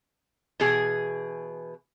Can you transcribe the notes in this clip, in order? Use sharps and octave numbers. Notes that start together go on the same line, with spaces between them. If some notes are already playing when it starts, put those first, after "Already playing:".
B2 E3 G#4